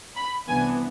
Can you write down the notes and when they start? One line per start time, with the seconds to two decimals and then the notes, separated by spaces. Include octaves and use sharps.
0.16 B5
0.48 C2 C3 E3 B3 D4 G#5